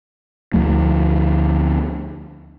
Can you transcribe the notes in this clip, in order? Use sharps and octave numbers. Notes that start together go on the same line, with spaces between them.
D2 F3 A3